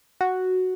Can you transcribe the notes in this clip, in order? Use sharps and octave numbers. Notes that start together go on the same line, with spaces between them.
F#4